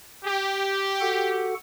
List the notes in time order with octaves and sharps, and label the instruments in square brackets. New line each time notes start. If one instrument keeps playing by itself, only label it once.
[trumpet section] G4
[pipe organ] F#4 A4 F#5